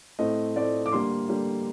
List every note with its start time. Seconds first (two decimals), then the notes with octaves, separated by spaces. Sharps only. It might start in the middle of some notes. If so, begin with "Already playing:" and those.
0.19 A2 A3 C4 D#5
0.55 A2 A3 C4 D5
0.86 D6
0.92 D3 G3 A#3 C6
1.29 D3 G3 A#3